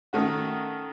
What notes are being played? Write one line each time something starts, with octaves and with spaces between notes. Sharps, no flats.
D#3 A3 C#4 F#4